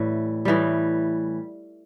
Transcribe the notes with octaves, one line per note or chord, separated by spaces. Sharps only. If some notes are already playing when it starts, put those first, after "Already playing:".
Already playing: A2 E3 G3
A2 E3 G3